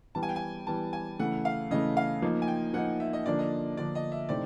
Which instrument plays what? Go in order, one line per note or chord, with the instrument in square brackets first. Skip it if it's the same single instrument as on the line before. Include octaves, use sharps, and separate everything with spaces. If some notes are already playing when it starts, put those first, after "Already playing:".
[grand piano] E3 G3 B3 [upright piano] A5
[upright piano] G#5
G5
G#5
[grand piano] E3 G3 B3 [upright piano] A5
[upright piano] G#5
[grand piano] C#3 E3 A3 [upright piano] F#5
[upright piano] F5
[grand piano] C#3 E3 A3 [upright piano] D#5
[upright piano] F5
[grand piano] F3 A#3 D#4
[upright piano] G#5
G5
[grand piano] F3 A#3 D#4 [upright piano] F#5
[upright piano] E5
D#5
[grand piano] D3 F3 A#3 D4 [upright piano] D5
[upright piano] D#5
[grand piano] D3 F3 A#3 D4 [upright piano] D5
[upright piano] D#5
E5
[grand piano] C3 E3 A3 C4 D#4 [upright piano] D5